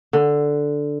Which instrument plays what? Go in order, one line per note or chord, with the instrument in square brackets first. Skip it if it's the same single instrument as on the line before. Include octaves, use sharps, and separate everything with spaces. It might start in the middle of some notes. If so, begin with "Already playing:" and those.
[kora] D3